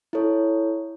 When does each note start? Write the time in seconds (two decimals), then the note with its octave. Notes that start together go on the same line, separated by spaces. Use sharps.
0.13 E4 A4 C#5